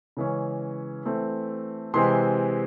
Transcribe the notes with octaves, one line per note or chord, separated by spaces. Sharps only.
C#3 E3 G#3 C#4
E3 A3 C4
C3 E3 G#3 C4 C6